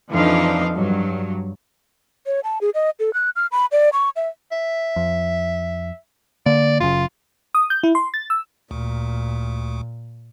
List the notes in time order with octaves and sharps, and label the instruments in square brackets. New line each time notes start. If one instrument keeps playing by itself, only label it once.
[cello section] F2 E3 F3 D4 D#4 F5
G2 F#3
[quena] C#5
A5
G#4
D#5
A4
F#6
F6
B5
D5
C#6
E5
[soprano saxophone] E5
[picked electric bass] F2
[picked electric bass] D3 A#3 [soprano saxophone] D5
[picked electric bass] F#1 F#2 C#3 [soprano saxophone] F4
[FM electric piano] D#6
G6
E4
C6
A6
E6
[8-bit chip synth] D2 [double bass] A#2